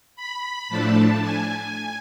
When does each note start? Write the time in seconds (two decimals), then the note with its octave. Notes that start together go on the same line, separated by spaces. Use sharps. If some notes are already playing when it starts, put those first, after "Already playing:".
0.16 B5
0.69 A2 F3 A3 D4 A5
1.22 G#5